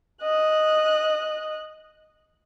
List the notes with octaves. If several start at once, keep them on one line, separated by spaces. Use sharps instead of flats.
D#5 F#6